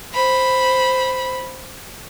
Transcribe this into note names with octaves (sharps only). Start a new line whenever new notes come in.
C5 B5